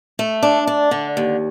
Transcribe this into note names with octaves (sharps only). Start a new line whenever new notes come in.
A3
D4
D4
D3
D#2